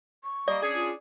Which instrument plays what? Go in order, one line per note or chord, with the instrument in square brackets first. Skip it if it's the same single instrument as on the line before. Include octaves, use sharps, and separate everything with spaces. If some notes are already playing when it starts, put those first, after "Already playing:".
[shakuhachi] C#6
[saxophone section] G3 A#3 D#5 [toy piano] D5
[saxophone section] C#4 D4 G#4
[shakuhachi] F4